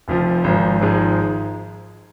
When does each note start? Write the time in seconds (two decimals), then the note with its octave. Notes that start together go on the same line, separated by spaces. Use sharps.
0.08 F1 F2 F3
0.44 G#1 G#2 F3
0.81 G#1 G#2 F3 G#3